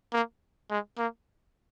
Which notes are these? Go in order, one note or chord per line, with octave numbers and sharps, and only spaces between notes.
A#3
G#3
A#3